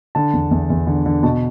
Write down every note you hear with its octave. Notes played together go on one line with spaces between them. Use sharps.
D3 A5
E2
E2
E2
D3
D3
B2 A5